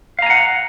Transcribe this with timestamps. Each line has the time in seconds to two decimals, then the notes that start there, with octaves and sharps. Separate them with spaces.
0.19 F5
0.22 A#5
0.26 G#5
0.30 F#5